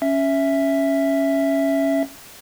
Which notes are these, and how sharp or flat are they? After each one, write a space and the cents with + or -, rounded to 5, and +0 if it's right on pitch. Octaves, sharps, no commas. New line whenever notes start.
C#4 +0 E5 +0